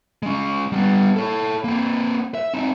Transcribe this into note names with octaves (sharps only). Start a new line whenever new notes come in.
G#3 C#4
G3 B3
A4 C#5
A#3 C4
E5
C4 D#4